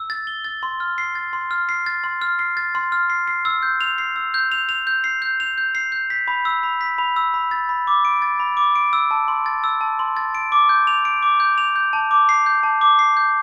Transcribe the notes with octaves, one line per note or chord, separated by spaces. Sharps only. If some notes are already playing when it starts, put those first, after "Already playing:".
Already playing: E6
A6
G7
A6
C6
F6
C7
A6
C6
F6
C7
A6
C6
F6
C7
A6
C6
F6
C7
C7
E6
G6
F7
C7
E6
G6
F7
F7
G6
C7
G6
F7
G6
C7
G6
B6
B5
E6
B5
B6
B5
E6
B5
A6
B5
D6
D7
A6
B5
D6
D7
E6
A5
C6
A6
E6
A5
C6
A6
D7
D6
G6
F7
D7
D6
G6
F7
G6
A5
D6
C7
G6
A5
D6
C7
G6